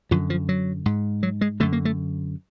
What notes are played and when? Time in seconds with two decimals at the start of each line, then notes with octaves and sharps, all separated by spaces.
0.11 F#2 D3 F3
0.30 F3
0.49 F#3
0.86 G#2
1.23 F#3
1.41 G#3
1.60 F#2 D3 A3
1.73 A#3
1.85 A3